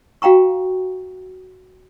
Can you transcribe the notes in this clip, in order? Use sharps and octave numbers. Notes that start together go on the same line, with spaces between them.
F#4 F5 G5 A#5 C#6